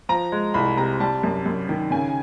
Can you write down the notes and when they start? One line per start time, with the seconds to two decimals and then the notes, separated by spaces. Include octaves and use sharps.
0.09 F3 A#5
0.32 G#3
0.54 C2 B5
0.77 C3 A#5
1.00 G3 A5
1.23 F#2
1.46 F#2
1.69 D#3
1.91 C#3 G#5